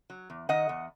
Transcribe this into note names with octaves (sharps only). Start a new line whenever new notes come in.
F#3
E2
D#3 D#5 F#5
E2